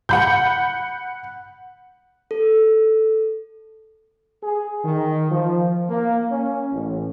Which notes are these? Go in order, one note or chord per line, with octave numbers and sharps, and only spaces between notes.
F#5 B5 G6
A4
G#4
D#3
F3
A#3
C#4
A1